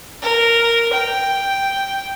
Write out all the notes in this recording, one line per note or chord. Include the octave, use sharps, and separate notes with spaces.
A#4
G5